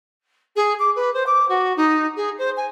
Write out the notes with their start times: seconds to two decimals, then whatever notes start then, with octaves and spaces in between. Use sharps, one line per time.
0.56 G#4
0.79 D6
0.96 B4
1.14 C5
1.26 D6
1.49 F#4
1.76 D#4
2.17 G#4
2.38 C5
2.57 G#5